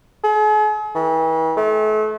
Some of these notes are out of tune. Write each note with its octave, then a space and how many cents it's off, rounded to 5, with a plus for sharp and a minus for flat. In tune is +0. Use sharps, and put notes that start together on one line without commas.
G#4 +45
E3 -40
A3 -35